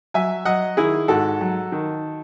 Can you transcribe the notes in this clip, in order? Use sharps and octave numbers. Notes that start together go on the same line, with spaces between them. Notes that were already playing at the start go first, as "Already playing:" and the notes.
F#3 E5 G#5
F#3 D#5 F#5
D#3 E4 G#4
G#2 F#4 A4
F#3
D#3